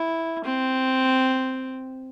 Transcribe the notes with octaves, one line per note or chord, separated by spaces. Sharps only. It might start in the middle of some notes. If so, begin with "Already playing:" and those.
Already playing: E4
C4